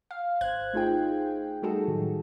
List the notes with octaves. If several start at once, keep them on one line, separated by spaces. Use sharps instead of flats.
F5
G#1 C5 F#6 G#6
A3 D#4 F4 G#4 G5
G3 A3 D#4 F#4 G#4 A4
A2 D#3 F#3